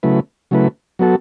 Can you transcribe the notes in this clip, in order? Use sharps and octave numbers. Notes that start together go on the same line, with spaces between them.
C#3 F#3 A3 E4 B4
C#3 F#3 A3 E4 B4
F#3 B3 F#4 A4